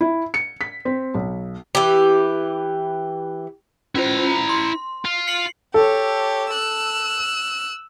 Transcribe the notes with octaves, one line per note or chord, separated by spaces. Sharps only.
E4
C#7
B6
C4
B1
E3 G4
C#4 E4 F4 C5 A#5
C6
F4
C7 C#7 F#7
G4 A4 C#5
E6 F#6